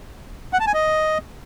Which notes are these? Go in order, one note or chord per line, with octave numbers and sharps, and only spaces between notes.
F#5
A5
G#5
D#5